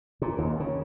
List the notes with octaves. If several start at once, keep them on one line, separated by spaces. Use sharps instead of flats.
A#2
D#2
C#3